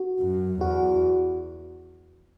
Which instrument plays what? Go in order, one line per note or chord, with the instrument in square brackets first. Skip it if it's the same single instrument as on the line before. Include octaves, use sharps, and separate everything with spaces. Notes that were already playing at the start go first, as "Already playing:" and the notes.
Already playing: [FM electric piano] F#4
[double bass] F#2
[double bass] E2 [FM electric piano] F#4